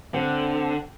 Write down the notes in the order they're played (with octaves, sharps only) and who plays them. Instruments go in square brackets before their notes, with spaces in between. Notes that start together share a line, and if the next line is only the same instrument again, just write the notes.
[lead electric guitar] D3 [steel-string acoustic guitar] C4